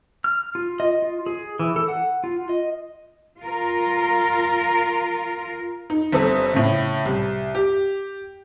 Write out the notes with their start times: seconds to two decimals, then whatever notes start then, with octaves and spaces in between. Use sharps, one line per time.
0.24 F6
0.55 F4
0.80 D#5
1.02 F4
1.26 G#4
1.59 E3
1.76 A4
1.88 F#5
2.24 F4
2.49 D#5
3.41 F4 A#4
5.90 D#4
6.12 G1 C4 A4 D#6
6.53 A2 C#3
7.06 C2
7.55 G4